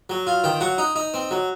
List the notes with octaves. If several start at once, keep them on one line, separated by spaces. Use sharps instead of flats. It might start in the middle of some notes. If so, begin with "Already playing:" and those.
F#3
F4
D#3 G5
F#3 F#5
D#4
D#4
C4
F#3